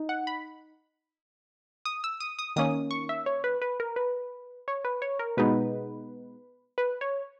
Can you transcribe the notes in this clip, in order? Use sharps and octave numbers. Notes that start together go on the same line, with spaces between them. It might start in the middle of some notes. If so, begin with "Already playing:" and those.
Already playing: D#4
F#5
B5
D#6
E6
D#6
D#6
D#3 A#3 C#4 D#6
C#6
E5
C#5
B4
B4
A#4
B4
C#5
B4
C#5
A#4
B2 G#3 B3 D#4 B4
B4
C#5